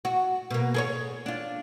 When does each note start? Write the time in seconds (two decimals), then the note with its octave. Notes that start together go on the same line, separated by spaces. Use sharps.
0.05 F#4
0.50 B2 A#3
0.74 G#4 A#4 C#5
1.26 D4 F4